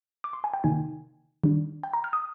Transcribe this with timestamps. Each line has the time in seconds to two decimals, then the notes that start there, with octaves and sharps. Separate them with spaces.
0.24 D6
0.33 C6
0.44 G#5
0.54 G5
0.64 C3 D#3 A#3 D#4 G#5
1.44 D#3 G3 D4
1.83 G5
1.93 A#5
2.04 F6
2.13 D#6